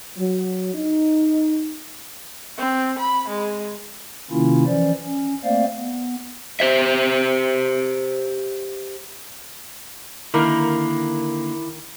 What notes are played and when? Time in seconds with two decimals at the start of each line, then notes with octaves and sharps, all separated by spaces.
0.16 F#3
0.74 D#4
2.58 C4
2.98 B5
3.28 G#3
4.31 C3 D#3 A#3 C#4 E4 F4
4.66 E3 F3 C#4 C5 D5
5.04 C#4
5.44 A3 A#3 C4 C5 D5 F5
5.77 B3
6.60 G4 C5 E5
10.34 D3 D#3 A#3 E4 A#4 B5 D6